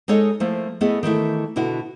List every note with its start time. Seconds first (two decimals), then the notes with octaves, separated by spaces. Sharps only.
0.08 G#3 D#4 A4 C#5 D#5
0.40 F3 A3 A#3 E4
0.81 A3 B3 E4 G#4 D#5
1.03 D#3 E3 A3 E4
1.56 B2 D3 E4 F#4